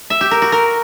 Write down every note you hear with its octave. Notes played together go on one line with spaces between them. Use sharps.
E5
G4
A#4
F#4
A#4